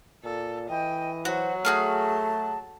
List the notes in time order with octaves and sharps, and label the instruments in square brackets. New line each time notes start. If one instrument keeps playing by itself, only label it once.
[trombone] A#2 [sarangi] A4
[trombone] E3 [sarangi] D#5 [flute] G5
[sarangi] F#3 [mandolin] F#4 [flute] C5
[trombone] A3 [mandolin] F#4 G#4 F6 [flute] A5